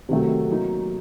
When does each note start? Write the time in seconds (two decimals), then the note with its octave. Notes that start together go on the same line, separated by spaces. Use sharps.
0.09 C3 D#3 F#3 A3
0.49 F#3 A#3 D#4